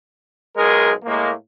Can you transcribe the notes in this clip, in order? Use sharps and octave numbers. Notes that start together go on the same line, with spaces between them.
B1 G#3 G#4 A#4
A2 G#3 A#3